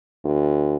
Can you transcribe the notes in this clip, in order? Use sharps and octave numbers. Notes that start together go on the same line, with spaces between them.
D2